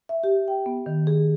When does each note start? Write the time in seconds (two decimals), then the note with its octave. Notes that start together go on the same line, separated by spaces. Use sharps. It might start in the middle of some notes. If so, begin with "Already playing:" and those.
0.09 E5
0.24 G4
0.48 G5
0.66 B3
0.86 D#3
1.07 G#4